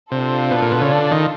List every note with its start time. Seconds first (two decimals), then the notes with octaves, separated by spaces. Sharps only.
0.12 C3 D4 F4 A4
0.51 B2
0.62 A#2
0.72 B2
0.81 C#3
0.92 D3
1.11 D#3